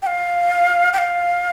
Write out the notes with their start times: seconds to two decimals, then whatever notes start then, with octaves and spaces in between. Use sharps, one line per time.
0.02 G5
0.07 F5
0.93 G5
0.98 F5